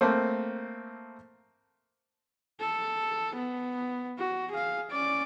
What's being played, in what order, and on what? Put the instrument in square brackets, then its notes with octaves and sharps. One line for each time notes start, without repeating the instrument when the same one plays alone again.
[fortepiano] A3 A#3 C4
[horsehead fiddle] A4
B3
F#4
G#4 F5
C#4 D5